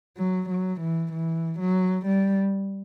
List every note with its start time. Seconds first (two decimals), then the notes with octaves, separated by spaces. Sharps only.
0.18 F#3
0.49 F#3
0.80 E3
1.12 E3
1.59 F#3
2.06 G3